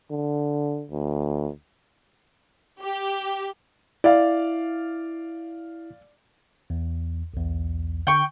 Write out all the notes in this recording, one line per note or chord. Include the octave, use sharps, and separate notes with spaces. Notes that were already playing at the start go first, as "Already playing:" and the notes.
D3
D2
G4
E4 D5 F5
E2
B1 E2
D3 G5 C#6